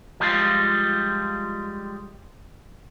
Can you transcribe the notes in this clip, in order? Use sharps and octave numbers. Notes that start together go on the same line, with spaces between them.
F3 G3 G#3 F4